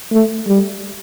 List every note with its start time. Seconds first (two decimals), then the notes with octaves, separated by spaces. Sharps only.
0.12 A3
0.47 G3